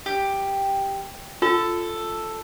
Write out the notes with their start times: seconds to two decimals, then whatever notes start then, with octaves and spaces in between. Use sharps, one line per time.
0.06 G4
1.42 F4 A4